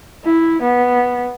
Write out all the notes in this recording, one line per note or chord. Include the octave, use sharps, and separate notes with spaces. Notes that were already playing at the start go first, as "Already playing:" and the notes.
E4
B3